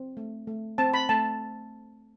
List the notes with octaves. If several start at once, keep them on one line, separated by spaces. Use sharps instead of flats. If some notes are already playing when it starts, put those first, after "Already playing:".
Already playing: C4
A3
A3
C4 A5
B5
A3 A5